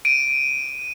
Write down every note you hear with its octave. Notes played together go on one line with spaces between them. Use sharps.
D7 D#7